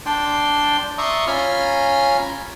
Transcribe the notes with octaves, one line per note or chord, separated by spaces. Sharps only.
D4 D5 G5 C6
D5 E5 A#5 C6 C#6 D#6
C#4 F4 G#5 A#5 B5 F6